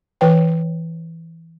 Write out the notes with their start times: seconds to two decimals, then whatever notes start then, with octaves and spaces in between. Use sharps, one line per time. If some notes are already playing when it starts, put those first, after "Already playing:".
0.21 E3 B4 C#5 G5